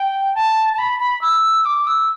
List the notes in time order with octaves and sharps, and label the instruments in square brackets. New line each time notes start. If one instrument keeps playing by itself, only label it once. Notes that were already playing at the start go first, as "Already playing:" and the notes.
Already playing: [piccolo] G5
A5
A5
B5
B5
E6
D6
E6